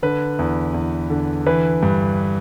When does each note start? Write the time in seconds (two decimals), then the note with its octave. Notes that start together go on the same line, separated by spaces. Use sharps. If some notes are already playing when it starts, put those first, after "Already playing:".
0.03 D3 B4
0.39 E2
0.74 E2
1.10 D3
1.46 E3 B4
1.83 G2